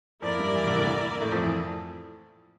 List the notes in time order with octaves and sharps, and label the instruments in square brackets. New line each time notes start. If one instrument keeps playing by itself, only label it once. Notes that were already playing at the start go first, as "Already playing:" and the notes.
[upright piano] F2 F3 [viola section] A#3 E4 A#4 D5
[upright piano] G2 G3
E2 E3
C2 C3
D2 D3
A2 A3
F2 F3
E3